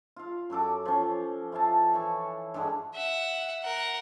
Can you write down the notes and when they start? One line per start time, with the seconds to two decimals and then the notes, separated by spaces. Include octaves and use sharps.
0.16 F4 F5
0.50 F#2 F#4 A4 D6
0.85 F3 C#4
1.52 F3 E4 F5 A5
1.94 E3 C#6
2.54 G2 D3 G3 G#3
2.94 E5 F#5
3.63 A#4 F#5